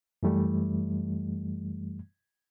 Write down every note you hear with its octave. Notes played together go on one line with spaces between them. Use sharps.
F#2 E3 G3 A3